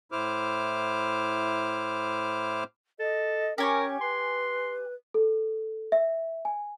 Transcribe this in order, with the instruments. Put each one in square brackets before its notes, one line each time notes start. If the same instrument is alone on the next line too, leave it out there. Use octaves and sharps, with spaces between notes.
[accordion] A2 E4 C5 D6 F6
[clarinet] A4 [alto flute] D#5
[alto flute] C#4 [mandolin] G4 G#5 C#6 [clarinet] A#4
[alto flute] B4 [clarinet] C6
[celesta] A4
E5
G#5